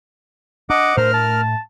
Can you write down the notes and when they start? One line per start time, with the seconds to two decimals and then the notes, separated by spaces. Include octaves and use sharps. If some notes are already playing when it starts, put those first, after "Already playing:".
0.70 D4 D#5 F#5 D6
0.97 A2 A3 D4 A#4 C5 F6
1.14 A5